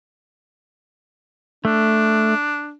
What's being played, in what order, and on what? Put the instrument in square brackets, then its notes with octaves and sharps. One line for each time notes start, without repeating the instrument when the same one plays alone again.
[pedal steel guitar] A3 [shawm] D4